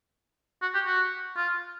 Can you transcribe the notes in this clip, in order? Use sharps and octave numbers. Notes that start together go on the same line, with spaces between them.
F#4
G4
F#4
F4